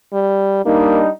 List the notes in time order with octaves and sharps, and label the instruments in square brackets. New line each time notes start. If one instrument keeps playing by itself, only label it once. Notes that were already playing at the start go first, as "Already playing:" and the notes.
[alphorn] G3
[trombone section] G3 D4 D#4 [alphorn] A#3